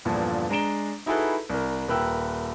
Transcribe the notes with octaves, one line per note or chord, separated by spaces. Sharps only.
E2 G2 A#2 D3 F3
G#3 D4 A#5 D7 E7 G7
D#4 E4 F#4 G#4 A4 B4
C2 A#4
D#1 A#4 B4 G5 E6